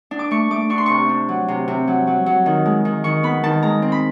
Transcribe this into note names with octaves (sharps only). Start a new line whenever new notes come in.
D4
D6
A3 C#6
A3 D6
D4 C#6
C6
C3 C#6
D4
F#3
C3
C3
F#3
F#3
F#3
D#3
G#3
D#3
D#3 C#6
B3 B5
D#3 A5
G#3 A#5
C4
B5